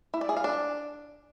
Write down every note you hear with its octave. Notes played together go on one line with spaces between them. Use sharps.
E4
D5
G#4
F5
D4